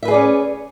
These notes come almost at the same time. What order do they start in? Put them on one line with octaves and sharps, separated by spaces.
E5 B4 G#4 D5 C#4